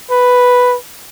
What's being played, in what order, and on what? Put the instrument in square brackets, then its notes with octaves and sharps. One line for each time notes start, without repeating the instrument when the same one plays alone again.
[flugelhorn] B4